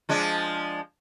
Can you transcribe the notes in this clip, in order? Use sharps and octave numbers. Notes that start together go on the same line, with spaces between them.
F3 G#3 D4